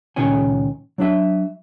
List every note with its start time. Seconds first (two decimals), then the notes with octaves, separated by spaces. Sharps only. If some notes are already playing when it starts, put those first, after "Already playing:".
0.16 C#2 A#2 D#3 C#4 C#5 G#5
0.98 F#3 D4 E5